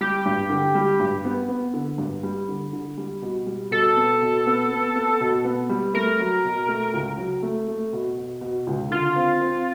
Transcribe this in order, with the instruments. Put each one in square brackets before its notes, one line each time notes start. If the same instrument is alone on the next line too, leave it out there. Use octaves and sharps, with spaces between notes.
[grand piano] G3 [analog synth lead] G4
[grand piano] G2
D3
G3
G2
B3
B3
D3
G2
G3
D3
D3
G3
B2
G3
[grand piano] B2 [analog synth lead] A4
[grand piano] B3
B2
B3
B3
B3
B2
B3
G3
[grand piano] A3 [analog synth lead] A#4
[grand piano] F#3
B2
A3
C#2
F#3
A3
A3
B2
B2
B2
C#2
[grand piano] D3 [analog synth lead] F4
[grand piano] C4
C4